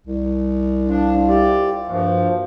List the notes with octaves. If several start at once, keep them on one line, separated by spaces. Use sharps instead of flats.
C2
F3 D4
F4 G4 D5 E5 F#5
G2 A#2 F3 F#4 F5